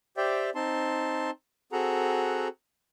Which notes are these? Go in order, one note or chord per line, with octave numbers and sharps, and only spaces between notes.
G4 C5 D5 E5 G5
C4 D#4 A5 C6
C4 F#4 G#4 A4 F#5 A#5